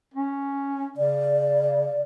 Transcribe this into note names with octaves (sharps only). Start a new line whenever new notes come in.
C#4
C#3 D5